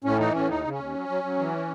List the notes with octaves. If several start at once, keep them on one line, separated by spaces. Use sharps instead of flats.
A2 C#4
E3 D#4
A2 C#4
D#2 D#4
C#3
C#4
D#2
F#3
F#3
F#3
E3